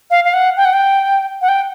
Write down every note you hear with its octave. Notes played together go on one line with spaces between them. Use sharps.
F5
F5
F#5
G5
F#5
G5
F#5
G5